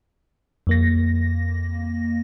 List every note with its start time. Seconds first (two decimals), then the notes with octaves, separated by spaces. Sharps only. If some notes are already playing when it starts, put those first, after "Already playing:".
0.67 F2 A#3 A#6